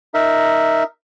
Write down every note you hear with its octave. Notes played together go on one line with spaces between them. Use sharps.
D#4 A#4 E5